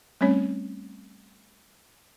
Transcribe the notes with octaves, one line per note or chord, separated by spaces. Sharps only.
G3 A3 C4 C#4 C#5